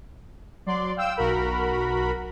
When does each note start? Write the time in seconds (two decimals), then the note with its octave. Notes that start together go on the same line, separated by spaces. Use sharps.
0.66 F#3 D5 C6
0.96 F5 G5 E6
1.16 B1 F#4 A#4 B5